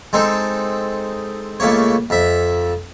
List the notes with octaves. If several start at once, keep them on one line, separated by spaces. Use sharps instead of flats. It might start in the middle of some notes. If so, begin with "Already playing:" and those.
G#3 C4 D#4 A4
C#2 A3 A#3 C#5
F2 E5